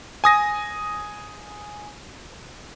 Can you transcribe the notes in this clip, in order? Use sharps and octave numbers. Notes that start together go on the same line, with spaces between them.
G#5 D#6 A#6